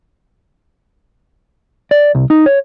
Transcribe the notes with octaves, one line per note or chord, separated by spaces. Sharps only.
D5
C2
D#4
C#5